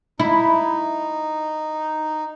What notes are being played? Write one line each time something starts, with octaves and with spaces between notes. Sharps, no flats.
D#4 E4